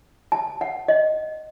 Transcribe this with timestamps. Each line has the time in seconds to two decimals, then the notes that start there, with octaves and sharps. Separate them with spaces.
0.32 A5
0.61 F#5
0.88 D#5